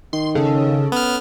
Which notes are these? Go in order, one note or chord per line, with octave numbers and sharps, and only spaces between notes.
D#3 C6
C#3 C#4 A4
B3 F6